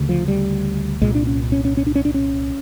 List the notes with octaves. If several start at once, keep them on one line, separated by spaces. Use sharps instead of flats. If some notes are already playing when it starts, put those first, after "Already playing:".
Already playing: D2 C#3
F3
G3
C2 A#2 G#3
D4
C#4
C#4
C#4
C#4
D4
C#4
D4
C#4